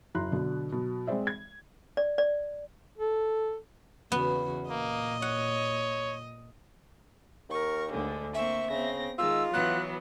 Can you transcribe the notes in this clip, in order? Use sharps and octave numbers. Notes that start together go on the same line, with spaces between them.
F#1 E4 F#4 A#5 C6 F#6
B2 D3 F#3
B2 F#3
G#3 C4 G#4 C5 D5 E5
G#6
D5
D5
A4
E2 C#3 B3 F#4
A#2 A#3 D#5
C#5 F#5
D#2 A#4 C#6
D2 D3 G#3
A#3 C4 E5 C#6
C#3 B3 C4 A#6
D#3 G#3 F4 E6
E3 F#3 B3 F#6